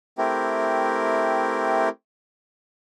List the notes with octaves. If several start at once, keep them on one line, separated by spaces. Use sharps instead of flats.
A3 C4 E4 G4 A#4